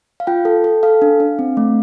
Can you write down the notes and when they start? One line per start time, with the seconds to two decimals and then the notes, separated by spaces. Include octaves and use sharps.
0.20 F5
0.27 F4 G5
0.45 A4
0.64 A4
0.83 A4 F5
1.02 D4
1.20 D4
1.39 C4
1.57 A3